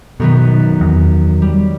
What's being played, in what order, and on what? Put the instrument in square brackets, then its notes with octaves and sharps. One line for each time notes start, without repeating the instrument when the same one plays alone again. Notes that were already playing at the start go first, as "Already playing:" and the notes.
[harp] F#2 D#3 B3 [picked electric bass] B2
[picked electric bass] E2
[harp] G3